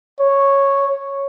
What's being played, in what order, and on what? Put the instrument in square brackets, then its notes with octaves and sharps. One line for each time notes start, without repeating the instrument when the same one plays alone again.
[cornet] C#5